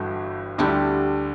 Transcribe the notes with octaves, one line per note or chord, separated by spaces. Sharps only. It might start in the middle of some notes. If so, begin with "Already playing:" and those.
Already playing: G1 G2 E3 F#4 A4
D2 D3 G3 E4 G4